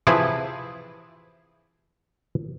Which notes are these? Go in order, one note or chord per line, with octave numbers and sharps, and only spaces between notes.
C3 E3 F3 E4 G#4 B4